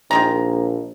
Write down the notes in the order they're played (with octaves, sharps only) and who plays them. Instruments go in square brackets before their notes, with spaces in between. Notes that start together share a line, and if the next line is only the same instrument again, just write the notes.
[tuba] A#1 [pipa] D#3 G#3 A#5